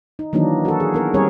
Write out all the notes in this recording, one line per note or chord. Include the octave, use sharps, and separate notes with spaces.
D#4
D#3 E3 F#3 A#3 D4 D#4
F#4 A4
G#4
B3 A#4
G3 C4 C#4 G#4 A#4 C#5